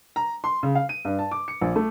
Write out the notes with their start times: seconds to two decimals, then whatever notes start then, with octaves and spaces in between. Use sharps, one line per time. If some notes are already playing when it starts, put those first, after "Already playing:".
0.16 A#5
0.44 C6
0.63 C#3
0.75 F5
0.89 D#7
1.05 G2
1.19 A5
1.31 D6
1.48 C#7
1.61 A#1
1.76 A3